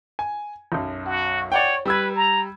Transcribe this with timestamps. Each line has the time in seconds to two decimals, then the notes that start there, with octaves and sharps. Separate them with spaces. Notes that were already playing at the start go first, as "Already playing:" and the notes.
0.19 G#5
0.72 B1 F#2
1.06 F#4
1.52 C#5 D5 F#5 G5
1.86 G3 B4 E6 G#6
2.16 A#5